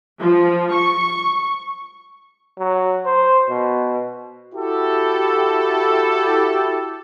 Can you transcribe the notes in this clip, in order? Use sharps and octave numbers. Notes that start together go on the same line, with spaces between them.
F3
C#6
F#3
C5
B2
E4 F#4 G4 A4